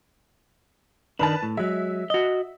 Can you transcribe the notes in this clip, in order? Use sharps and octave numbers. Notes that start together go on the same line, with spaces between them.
D#3 D4 B4 A5
A2
F#3 G#3 E5
F#4 D#5